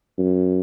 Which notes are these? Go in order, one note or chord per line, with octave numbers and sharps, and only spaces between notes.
F#2